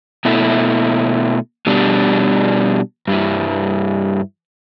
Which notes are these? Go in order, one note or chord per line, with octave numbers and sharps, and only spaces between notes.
B2 A3 E4
B2 G3 D4
G2 G3 E4